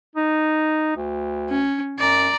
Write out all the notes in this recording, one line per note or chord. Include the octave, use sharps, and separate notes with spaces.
D#4
D2
C#4
F#2 D5 A#5